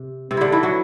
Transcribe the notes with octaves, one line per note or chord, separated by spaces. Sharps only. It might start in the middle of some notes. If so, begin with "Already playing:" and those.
Already playing: C3
C3 C4
D3 D4 E4
E3 E4
F#3 F#4